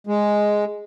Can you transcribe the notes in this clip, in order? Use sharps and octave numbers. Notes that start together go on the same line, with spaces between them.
G#3